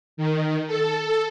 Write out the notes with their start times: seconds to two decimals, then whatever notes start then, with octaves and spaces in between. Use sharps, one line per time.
0.17 D#3
0.67 A4